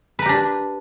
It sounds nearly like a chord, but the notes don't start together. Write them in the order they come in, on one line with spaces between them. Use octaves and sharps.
B4 A#4 G4 D4